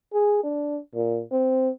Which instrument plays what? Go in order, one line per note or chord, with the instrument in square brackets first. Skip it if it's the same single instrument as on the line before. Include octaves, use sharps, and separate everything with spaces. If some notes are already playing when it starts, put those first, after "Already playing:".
[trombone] G#4
D4
A#2
C4